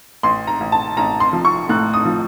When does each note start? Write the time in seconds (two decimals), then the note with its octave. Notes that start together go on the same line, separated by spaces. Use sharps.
0.23 A1 C6
0.47 A#5
0.61 A1
0.72 A5
0.97 A1 A#5
1.20 C6
1.33 F3
1.45 C#6
1.69 A2 F#6
1.93 D#6
2.05 F3